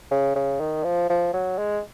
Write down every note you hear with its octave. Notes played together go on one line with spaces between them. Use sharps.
C#3
C#3
D#3
F3
F3
F#3
G#3